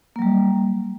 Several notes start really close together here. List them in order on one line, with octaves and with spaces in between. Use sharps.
A#3 F#3 G3